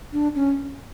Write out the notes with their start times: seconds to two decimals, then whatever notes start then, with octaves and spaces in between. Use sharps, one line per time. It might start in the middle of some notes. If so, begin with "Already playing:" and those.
0.13 D4
0.35 C#4